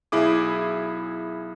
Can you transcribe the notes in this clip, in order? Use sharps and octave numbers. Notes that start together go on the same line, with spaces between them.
B1 E4 G#4 D6